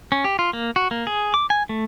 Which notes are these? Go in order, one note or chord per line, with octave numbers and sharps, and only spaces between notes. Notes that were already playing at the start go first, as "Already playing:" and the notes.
C#4
G4
F4
A#3
F#4
A#3
G#4
D6
G#5
A3